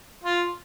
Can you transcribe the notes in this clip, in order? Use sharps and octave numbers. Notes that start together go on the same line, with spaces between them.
F4